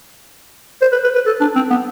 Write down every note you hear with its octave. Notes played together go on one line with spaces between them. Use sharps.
C5
B4
B4
B4
A4
D4
C4
B3